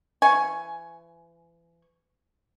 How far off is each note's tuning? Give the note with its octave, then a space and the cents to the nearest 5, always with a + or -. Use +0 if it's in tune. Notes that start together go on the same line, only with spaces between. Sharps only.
E3 +35 G#5 +10 C#6 +0